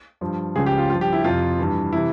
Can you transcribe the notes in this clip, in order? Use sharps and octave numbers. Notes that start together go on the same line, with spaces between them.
G2 F3
C#2 C#3 F3 G#4
G4
F4
G2 F3 F4
G4
E4
F2 C3 F3 F4
G2 E3
C3 E3 E4